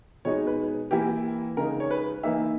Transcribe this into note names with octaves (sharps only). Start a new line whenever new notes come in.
B2 G#3 D#4 C#5
B4
E3 A#3 E4 G4
C#3 G#3 D#4 A#4
C#5
B4
E3 A#3 D#4 E5